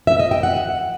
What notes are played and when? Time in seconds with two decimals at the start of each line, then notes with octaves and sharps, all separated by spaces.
0.07 E5
0.19 D#5
0.31 G5
0.43 F#5